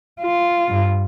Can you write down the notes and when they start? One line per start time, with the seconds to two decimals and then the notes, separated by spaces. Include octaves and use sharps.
0.21 F4
0.68 G2